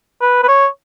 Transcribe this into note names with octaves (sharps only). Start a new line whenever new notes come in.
B4
B4
C#5